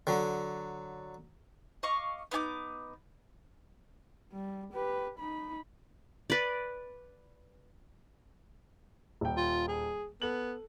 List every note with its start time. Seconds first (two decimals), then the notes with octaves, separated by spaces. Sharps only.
0.07 D3 F#3
1.83 D#5 F5 C#6 D6
2.31 B3 D#4 G#5 D6
4.32 G3
4.73 G4 B4
5.19 D#4 B5
6.30 B4 D5
9.21 D#1 G5
9.37 F4
9.68 G#4
10.22 B3 A4 F#7